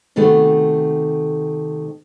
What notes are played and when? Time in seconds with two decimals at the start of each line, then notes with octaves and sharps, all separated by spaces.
0.16 C3 D#3 A3 B3 F#4 A4